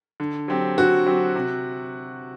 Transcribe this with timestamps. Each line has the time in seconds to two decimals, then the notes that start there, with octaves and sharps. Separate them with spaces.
0.20 D3
0.48 F#3 C4 G4
0.77 D3 F#4
1.06 F#3 C4 G4
1.35 C3